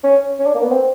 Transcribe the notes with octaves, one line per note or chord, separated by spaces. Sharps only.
C#4
C#4
D4
A#3
B3
C4